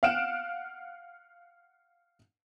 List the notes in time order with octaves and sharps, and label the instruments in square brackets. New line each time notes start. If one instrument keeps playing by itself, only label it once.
[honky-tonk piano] F5 F#5 F6 F#6 D7 E7